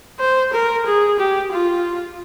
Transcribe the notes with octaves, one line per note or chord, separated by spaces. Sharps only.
C5
A#4
G#4
G4
F4